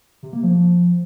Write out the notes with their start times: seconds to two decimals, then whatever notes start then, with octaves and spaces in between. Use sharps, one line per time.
0.23 C3
0.33 A#3
0.43 F3